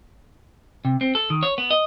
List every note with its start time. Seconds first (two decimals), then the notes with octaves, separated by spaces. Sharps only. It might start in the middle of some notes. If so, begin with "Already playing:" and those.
0.85 C3
1.01 C4
1.15 A4
1.30 D#3
1.43 C#5
1.58 B3
1.71 D#5